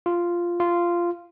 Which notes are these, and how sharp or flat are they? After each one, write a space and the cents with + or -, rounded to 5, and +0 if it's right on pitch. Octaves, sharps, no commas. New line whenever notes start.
F4 -5
F4 -10